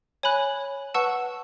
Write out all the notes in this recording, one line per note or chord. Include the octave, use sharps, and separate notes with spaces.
C#5 G#5 B5 F#6
B4 F#5 A5 C#6 E6